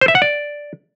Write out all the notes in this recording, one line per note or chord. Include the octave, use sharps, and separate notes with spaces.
C5
E5
F#5
D5